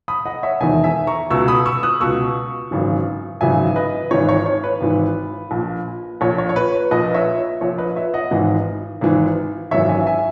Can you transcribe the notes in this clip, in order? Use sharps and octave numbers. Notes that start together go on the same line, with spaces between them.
B5 D#6
D#5 F#5
C#5 E5
E1 E2 D#3 E5 G#5
E5 G#5
A#5 C#6
C#2 B2 C#6 E6
B5 D#6
C#6 E6
D#6 F#6
C#2 B2 C#6 E6
G#1 F#2 C#3 E3
G#1 F#2 C#3 E3 E5 G#5
B4 D#5
G#1 G#2 E3 C#5
C#5
C#5
B4
G#1 G#2 E3
A#1 A#2
A#1 A#2 C#5
C#5
C#5
B4
A#1 A#2 B4 D#5
C#5 E5
A#1 A#2 C#5
B4 D#5
C#5 E5
D#5 F#5
G#1 G#2 E3
G#1 G#2 E3
G#1 F#2 E3 C#5 E5
E5 G#5
E5 G#5